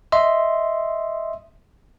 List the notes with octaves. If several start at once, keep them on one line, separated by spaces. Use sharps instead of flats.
D#5 E5 C6